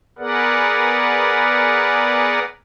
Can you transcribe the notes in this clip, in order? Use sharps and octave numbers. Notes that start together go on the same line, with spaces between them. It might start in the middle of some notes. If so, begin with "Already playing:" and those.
B3 G#4 A#4 B4 D5 F#5